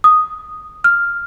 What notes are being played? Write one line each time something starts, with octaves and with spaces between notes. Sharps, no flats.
D#6
F6